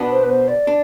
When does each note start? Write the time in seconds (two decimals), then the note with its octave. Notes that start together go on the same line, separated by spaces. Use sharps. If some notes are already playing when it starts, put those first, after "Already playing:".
Already playing: B2 B3 D4
0.11 C5
0.23 B4
0.29 C5
0.48 D5
0.67 D4